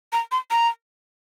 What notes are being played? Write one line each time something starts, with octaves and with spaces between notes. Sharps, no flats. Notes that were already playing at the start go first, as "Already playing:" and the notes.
A#5
C6
A#5